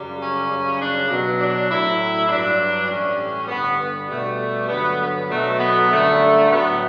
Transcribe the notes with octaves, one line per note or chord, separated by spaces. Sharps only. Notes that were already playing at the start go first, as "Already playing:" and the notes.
Already playing: F#2 C#3 G3
C#4
F#2 C#3 G3
D4
B2 F#3
D4
A2 F#3 E4
G2 F#3 D4
A2 E3 G3 C#4
G2 D3 G3 B3
B3
B2 G3 A3
G2 D3 F#3 B3
B3
B2 F#3 A3
B3
F#2 D3 G3 A3
A2 F#3 B3